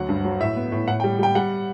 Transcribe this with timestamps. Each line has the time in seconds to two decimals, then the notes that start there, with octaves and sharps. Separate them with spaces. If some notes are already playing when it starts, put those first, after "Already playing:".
Already playing: D2 F#3 F#5
0.09 G2
0.25 F#3
0.40 A2 E5
0.56 B3
0.72 A2
0.88 A2 F#5
1.00 G5
1.04 G3
1.19 G3 G5
1.35 G3 F#5